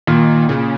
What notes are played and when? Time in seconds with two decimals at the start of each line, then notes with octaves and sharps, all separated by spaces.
0.07 A#2 D#3
0.49 A#2 C#3